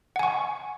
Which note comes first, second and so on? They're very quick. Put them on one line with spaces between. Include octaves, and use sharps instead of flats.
F#5 G#5 C#6